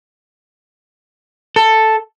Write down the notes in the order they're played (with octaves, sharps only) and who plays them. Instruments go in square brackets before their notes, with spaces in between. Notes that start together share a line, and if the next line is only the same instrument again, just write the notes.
[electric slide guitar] A4